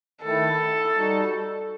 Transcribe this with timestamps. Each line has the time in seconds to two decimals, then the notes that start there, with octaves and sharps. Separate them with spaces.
0.23 D#3 A3 E4 A4
0.96 G3 D#4 F#4